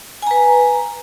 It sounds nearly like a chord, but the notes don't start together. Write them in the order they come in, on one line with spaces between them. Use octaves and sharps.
G#5 A#5 B4